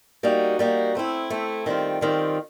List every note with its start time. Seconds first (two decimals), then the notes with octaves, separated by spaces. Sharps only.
0.23 G3 A#3 D#4 F#4
0.59 G3 A#3 D#4 F#4
0.95 A3 C4 E4
1.30 A3 C4 E4
1.66 D#3 G3 C4 F4
2.01 D#3 G3 C4 F4